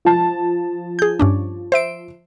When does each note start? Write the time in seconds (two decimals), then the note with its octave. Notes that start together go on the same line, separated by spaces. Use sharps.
0.05 F3 A5
0.99 G#4 G6
1.20 G2 C#4 D4
1.72 C5 E5 D7